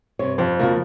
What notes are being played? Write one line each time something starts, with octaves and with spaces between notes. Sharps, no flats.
G2 C3 C#5
F2 C5
C#3 F3 A#3 F#4